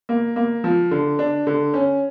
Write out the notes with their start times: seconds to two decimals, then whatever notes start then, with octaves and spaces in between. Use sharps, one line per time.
0.09 A#3
0.36 A#3
0.64 F3
0.91 D3
1.19 D4
1.47 D3
1.74 C#4